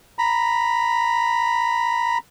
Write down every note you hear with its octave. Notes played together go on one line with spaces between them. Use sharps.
A#5 B5